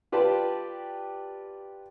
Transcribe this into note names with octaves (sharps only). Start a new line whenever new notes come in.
F4 G4 B4 D5 G5 A5